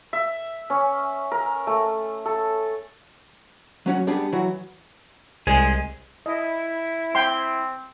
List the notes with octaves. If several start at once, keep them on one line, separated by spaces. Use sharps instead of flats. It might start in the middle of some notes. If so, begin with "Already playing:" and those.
E5
C#4
A#4
A3
A4
F#3 C#4 F#4
G3 B3 D4 G4 G#4
E3 F#3 E4 F#4
C2 G#3 G#5
E4 D#5
C4 G5 C6